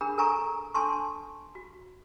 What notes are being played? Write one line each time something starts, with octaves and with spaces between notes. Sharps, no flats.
D4 G#4 A#4 B5
A4 A#4 G#5 A#5 C#6
D4 A4 A5 C6 C#6
F#4